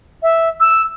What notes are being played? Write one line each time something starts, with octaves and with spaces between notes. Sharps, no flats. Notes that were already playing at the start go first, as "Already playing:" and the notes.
E5
E6